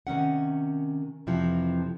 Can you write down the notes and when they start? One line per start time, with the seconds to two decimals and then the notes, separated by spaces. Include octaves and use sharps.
0.07 C3 D#3 C#4 F#5
1.27 F2 C3 E3 F3